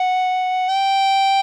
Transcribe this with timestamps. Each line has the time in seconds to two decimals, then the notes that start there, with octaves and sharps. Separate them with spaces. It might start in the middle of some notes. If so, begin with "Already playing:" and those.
Already playing: F#5
0.69 G5